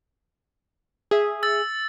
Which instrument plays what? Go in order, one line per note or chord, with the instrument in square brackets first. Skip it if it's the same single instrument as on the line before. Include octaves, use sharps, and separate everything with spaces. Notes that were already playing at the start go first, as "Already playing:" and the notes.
[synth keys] G#4 E5
[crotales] E6 A6